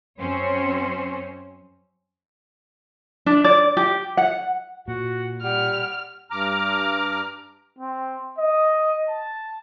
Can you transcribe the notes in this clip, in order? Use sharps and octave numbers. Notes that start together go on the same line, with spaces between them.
F#2 C4 C#4 C5 C#5
D4
D5
G4
F#5
A#2 F#4
G3 F#5 F6
G2 A#5 D6 F6
C4
D#5
A5